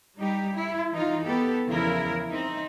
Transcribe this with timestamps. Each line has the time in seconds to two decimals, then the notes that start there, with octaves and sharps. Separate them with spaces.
0.17 G3 D#4 G4
0.55 E4
0.92 E3 D#4 F4
1.25 B3 G4 A4
1.67 E2 C#3 E3 F3 E4 A#4
2.30 C4 D#4 E5